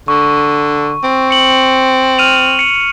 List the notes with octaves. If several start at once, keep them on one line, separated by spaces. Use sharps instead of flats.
D3 C#6
C4
C#7 F#7
F6 D#7 F7
C#7